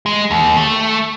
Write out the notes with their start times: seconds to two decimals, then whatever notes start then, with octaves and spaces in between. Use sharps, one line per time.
0.06 G#3
0.31 D#2
0.57 A3